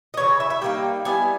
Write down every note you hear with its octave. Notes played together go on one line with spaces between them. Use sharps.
D#5
C#3 E3 C#5
E5
E5
G3 A#3 D#4 G5
G3 B3 E4 G#5